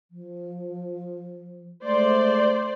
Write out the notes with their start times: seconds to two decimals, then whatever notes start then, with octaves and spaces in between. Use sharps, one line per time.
0.11 F3
1.83 G#3 A3 C5 D5